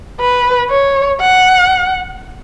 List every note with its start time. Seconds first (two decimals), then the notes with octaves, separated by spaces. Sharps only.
0.21 B4
0.70 C#5
1.21 F#5